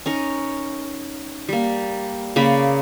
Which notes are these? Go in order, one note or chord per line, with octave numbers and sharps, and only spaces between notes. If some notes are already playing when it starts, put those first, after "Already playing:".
C#4 D#4 A#4
G3 A#3
C#3 A#3 D5 B5